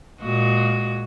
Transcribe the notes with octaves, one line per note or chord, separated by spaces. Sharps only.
A#2 G#3 F#4